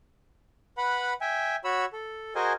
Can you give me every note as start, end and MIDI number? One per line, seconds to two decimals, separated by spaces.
0.78 1.14 71
0.78 1.14 78
0.78 1.14 83
1.21 1.56 76
1.21 1.56 79
1.21 1.56 80
1.64 1.85 66
1.64 1.85 73
1.64 1.85 83
1.64 1.85 88
1.93 2.34 69
2.35 2.53 66
2.35 2.53 68
2.35 2.53 70
2.35 2.53 72
2.35 2.53 75
2.35 2.53 80